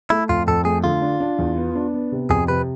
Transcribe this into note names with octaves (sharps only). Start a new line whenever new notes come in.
A3 E4
F2 F4
F2 A4
A3 G#4
D3 F4
D4
D4
E2
B3
D4
B3
C3
F2 G#4
C3 B4